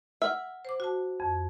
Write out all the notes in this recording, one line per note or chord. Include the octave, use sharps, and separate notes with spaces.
E5 F#5 F6
C5 D6
F#4 A5
F2